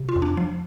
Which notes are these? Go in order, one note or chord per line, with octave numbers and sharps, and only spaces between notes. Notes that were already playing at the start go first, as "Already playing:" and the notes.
Already playing: C3
F4
F2
D4
F3